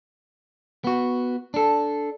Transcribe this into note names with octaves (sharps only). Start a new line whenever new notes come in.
B3 F#4
D4 A4